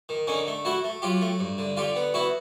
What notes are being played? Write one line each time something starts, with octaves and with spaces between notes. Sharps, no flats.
D#3
D3 C#4 D#4
A3
A3 E4 F#4
A3
F#3 F4 G4
A3
G2
D3
D3 F4 G4
B3
B3 E4 F#4